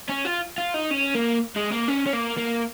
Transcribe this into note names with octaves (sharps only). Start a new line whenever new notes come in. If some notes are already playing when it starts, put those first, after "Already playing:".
C#4
F4
F4
D#4
C#4
A#3
G#3
A#3
C#4
C#4
A#3
A#3